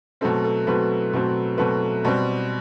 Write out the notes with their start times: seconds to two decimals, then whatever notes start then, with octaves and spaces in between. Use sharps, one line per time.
0.21 B2 F#3 A3 C4 A4
0.44 A4
0.67 B2 F#3 A3 C4 B4
1.13 B2 F#3 A3 C4
1.58 B2 F#3 A3 C4 B4
2.05 B2 G3 C4